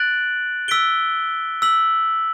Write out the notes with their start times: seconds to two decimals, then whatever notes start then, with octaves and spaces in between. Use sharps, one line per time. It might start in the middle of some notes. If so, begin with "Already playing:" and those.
Already playing: F#6 A6 D7 F#7
0.68 E6 B6 D7 G7
1.62 E6 B6 F#7